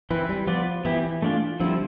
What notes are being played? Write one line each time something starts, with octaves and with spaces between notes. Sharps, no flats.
E3 C4 E4 B4
G3
F3 B3 F4 B4 D5
E3 B3 E4 G4
A3 D4 F4
D3 F3 G3 C4 E4